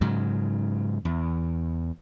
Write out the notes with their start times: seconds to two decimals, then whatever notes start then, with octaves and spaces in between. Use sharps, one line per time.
0.01 G#2 C#3 F#3
1.05 E2